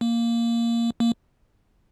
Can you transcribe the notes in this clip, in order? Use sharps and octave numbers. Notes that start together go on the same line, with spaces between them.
A#3
A#3